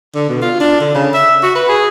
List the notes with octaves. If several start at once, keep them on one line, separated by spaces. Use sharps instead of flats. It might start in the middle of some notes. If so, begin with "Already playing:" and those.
D3
B2
F4
D4
D3
C#3
E5
F#4
B4
G#4